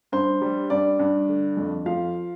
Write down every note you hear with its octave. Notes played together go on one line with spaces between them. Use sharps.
G2 C5
G3
G2 D5
G2
D3
F2
F3 F5